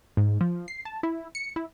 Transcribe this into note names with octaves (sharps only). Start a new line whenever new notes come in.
G#2
F3
C7
A5
E4
C#7
E4